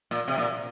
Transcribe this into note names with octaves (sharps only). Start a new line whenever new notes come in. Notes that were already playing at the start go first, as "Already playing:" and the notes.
A#2
C3
A#2